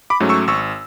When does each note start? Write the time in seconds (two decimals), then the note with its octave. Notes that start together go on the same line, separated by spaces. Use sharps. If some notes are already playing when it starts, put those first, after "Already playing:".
0.10 B5 D6
0.20 G#2 F#3 A3 C#4
0.29 C#6 E6
0.48 G#1 C#6 E6